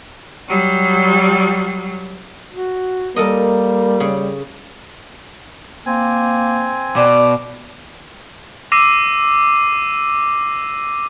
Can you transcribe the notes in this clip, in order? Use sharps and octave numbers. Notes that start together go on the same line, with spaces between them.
F#3 G3
F#4
G3 A#3 A4 A#4 D#5
C#3
A#3 C4 G#5
B2 D5 D6
D6 E6 A#6 C7 D#7